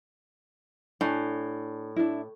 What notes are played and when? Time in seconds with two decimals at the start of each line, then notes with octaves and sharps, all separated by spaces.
1.01 A2 D4 G#5
1.96 D4 E4